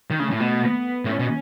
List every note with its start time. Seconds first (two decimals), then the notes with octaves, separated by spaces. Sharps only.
0.11 D#3
0.19 C#3 A3
0.31 A2
0.40 B2
0.62 B3
1.05 A2 C#4
1.20 B2